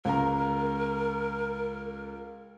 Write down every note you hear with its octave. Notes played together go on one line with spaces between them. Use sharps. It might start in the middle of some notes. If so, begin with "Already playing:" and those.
C#2 A#4 A#5